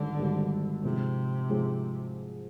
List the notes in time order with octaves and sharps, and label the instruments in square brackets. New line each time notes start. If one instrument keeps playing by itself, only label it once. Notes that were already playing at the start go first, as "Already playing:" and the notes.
Already playing: [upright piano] G#1 G#2 G3 [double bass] D3
[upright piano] G#1 G#2 G3
[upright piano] G#2 F3 G#3 [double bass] C3
[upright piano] G#2 F3 G#3